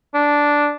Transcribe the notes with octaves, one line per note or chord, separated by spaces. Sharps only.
D4